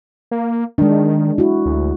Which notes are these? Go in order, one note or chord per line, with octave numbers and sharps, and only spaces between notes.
A#3
D#3 G#3 D4
E4 F#4
D2